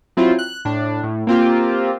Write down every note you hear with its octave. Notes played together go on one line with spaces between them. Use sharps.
F#3 C4 E4 F4
F#6
A2 D4
A2
A#3 C4 F4 G4